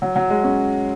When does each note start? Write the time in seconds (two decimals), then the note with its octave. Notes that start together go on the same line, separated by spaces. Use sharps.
0.02 F#3
0.16 F#3
0.30 G#3
0.44 C#4